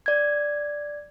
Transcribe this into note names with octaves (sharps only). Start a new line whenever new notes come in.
D5 G#6